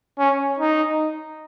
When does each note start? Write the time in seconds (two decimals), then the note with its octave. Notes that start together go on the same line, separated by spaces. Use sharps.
0.19 C#4
0.59 D#4